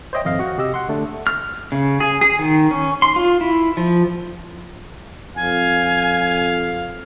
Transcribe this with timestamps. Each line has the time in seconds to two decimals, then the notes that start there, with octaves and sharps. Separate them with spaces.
0.13 C5 C#5 D#5 E5 G5
0.25 G#1 F2 D#5 F5
0.39 F#4 F#5
0.58 C3 G4 D#5 E6
0.74 F#5 C6
0.89 D3 A3 D4
1.27 F6
1.72 C#3
2.00 G#4
2.21 G#4
2.39 D#3
2.71 C#4
3.02 C6
3.16 F4
3.41 E4
3.77 F3
5.36 F2 F5 G#5